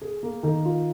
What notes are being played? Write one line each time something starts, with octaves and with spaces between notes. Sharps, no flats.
G#4
A#3
D#3
F4